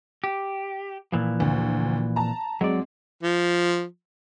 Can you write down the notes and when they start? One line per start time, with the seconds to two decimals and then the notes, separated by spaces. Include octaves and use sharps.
0.24 G4
1.12 A#2 E3 F3
1.40 D2
2.16 A5 A#5
2.61 F2 F#3 G#3 D5
3.23 F3